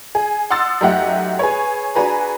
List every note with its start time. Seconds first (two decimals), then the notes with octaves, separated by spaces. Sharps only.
0.15 G#4
0.50 F#5 C6 D#6 E6 A6
0.81 F#2 A3 D#4 G4 E5 F#5
1.39 G#4 B4 C#5
1.95 D4 F#4 G#4 B4 A#5